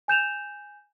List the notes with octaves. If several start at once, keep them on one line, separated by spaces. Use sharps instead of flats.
G#5 G6 E7 F7